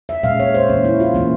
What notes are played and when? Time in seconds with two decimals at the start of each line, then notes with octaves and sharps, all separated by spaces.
0.09 E5
0.23 A#2 G#3 C#4 F5
0.39 C#5
0.54 C5
0.69 E3 A#3 C#4
0.85 E4
1.00 F4
1.14 E3 A#3 C#4